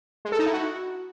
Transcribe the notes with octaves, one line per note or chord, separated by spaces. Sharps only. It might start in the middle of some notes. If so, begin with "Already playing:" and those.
G#3
A4
D#4
E4
F#4